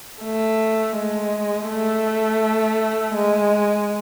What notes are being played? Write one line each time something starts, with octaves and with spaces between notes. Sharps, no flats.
A3
G#3
A3
G#3